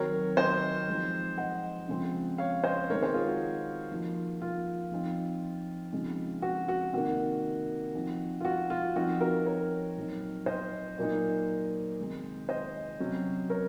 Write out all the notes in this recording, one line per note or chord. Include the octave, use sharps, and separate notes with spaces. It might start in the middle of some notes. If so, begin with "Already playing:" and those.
Already playing: D#3 F#3 C4 D#4 A#4 C#5
C5 D#5
F3 G#3 C4 D#4
D#5 F#5
C#3 F3 G#3 C4
C#5 F5
C5 D#5
D#3 G#3 C4 D#4 A#4 C#5
G#4 C5
F4 G#4
F#4
F3 A#3 D#4
F4
F3 C4 D#4
C#3 F3 G#3 C4 D#4
F#4
F#4
C3 D#3 A#3 D#4 F#4
F3 C4 D#4
F4
F#4
F4
F3 C4 D#4 F#4
F#4 A#4
A#4 C#5
A#2 F#3 C4 D#4
C5 D#5
A#2 F#3 A#3 D#4
C3 D#3 G#3 C4
C5 D#5
C3 F#3 C#4
A#4 C#5